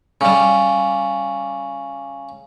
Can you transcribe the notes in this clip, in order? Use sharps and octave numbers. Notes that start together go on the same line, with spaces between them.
C#3 G3